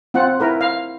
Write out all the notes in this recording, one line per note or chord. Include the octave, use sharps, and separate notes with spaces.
C4 F4 F#5
E4 A#4 B4
F5